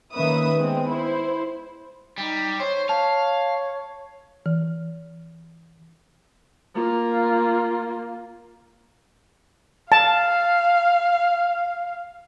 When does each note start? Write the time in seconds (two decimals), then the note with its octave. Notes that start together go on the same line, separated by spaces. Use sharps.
0.13 D#3 A#3 C#4 B4 E5 D#6
0.56 G#3 B3 C4
0.88 E4 C5
2.18 G3 D#4
2.60 C5 C#5
2.89 C#5 F5 A5
4.46 E3
6.75 A#3 F4
9.92 F5 A5